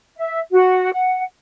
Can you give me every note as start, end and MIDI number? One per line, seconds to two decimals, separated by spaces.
0.16 0.40 76
0.51 0.90 66
0.92 1.23 78